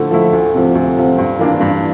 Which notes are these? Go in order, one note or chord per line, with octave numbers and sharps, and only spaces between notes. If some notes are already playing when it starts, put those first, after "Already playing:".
Already playing: D3 F3 A3 E4
F3 A3 E4
D2
C3 F3
D2
C3 F3
G2
E3 A#3 D4 F4
G2